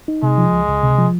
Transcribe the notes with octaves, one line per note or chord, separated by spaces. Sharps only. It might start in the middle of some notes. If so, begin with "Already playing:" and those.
D#4
C3 G#3
F3
C#2
C#2
C3
F3